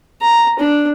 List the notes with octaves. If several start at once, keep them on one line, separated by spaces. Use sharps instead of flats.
A#5
D4